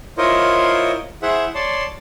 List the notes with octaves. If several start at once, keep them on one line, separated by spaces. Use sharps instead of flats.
E4 F4 A#4 C5 C#5 D#5
E4 G#4 C5 E5 F#5
C#5 D5 A5 C6